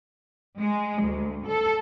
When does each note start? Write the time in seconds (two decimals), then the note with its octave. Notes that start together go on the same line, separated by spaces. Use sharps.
0.60 G#3
1.03 D2
1.46 A4